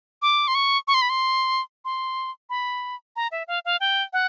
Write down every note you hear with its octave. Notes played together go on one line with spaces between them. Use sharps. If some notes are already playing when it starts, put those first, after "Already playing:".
D6
C6
C#6
C#6
C6
B5
C6
C6
B5
A#5
E5
F5
F5
G5
F#5